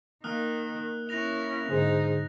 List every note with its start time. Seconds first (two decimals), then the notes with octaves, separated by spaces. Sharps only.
0.24 D#3 A#3 D#6 F6 F#6
1.09 C#4 E4 F#6 A#6 F7
1.69 G#2 D3 D#4 G#4 C5